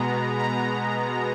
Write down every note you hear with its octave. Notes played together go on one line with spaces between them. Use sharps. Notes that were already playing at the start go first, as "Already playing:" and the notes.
Already playing: B2 G#3 B3 A#5
A#5